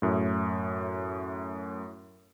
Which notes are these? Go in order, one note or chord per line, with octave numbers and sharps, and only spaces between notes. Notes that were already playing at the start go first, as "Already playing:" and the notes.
F#2 A2